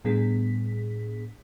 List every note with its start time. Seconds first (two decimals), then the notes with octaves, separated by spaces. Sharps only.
0.05 A2 G3 B3 D4 G#4 B6